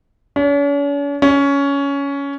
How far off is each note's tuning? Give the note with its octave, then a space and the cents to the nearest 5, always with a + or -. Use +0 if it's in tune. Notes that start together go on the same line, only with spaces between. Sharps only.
C#4 +45
C#4 +15